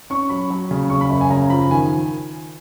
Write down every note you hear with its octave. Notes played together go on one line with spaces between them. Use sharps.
C#4 C#6
F#3 B5
F#3
C#3
C#3 C#6
B5
F#2
G#5
C#3 A#5
F3 B5
D#3 G#5